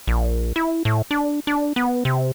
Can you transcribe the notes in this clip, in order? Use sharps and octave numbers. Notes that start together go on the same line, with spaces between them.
A#1
E4
A2
D4
D4
B3
C3